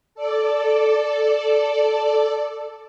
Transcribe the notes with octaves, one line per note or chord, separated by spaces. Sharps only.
A4 D5